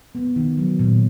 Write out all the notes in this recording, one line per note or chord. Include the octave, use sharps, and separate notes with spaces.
B3
D#3
F#3
A#2